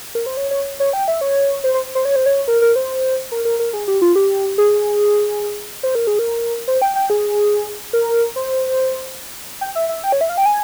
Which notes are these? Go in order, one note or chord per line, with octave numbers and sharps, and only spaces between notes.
A#4
C5
C#5
C#5
C#5
G5
E5
C#5
C5
C5
C5
C#5
C5
C#5
A#4
A#4
C5
A#4
A#4
A#4
G#4
G4
F4
G4
G#4
C5
A#4
G#4
A#4
C5
G5
G5
G#4
A#4
C5
G5
E5
E5
G5
C#5
E5
F5
G5
G#5